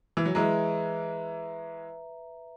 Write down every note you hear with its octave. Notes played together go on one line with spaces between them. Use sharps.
E3
F#3
E3 G#3 B4 E5 A#5